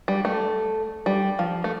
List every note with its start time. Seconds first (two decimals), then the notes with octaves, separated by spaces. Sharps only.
0.08 G3
0.25 A3
1.06 G3
1.39 F3
1.64 A3